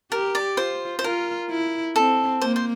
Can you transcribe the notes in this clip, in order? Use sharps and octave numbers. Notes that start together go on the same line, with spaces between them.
G4 A#4
D5
F4 C5
C5
F4 A#4
E4
C4 A4
A#3 C5
C5